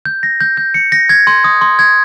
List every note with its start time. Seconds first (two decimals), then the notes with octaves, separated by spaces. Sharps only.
0.05 G6
0.23 A#6
0.41 G6
0.57 G6
0.74 C#7
0.92 A#6
1.09 G#6
1.27 C6
1.44 D#6
1.61 C6
1.79 G#6